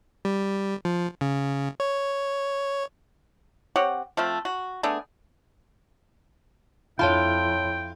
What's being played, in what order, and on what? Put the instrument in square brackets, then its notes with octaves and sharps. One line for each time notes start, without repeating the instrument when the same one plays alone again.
[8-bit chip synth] G3
F3
C#3
C#5
[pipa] C4 G4 C#5 F#5
F3 A3 C4
F#4
A3 B3 D4 G#4
[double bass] F2 E4 [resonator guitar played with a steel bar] F4 [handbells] C#5 A5 B5 [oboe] G5